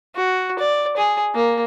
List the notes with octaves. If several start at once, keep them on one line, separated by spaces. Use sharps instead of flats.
F#4
D5
G#4
A#3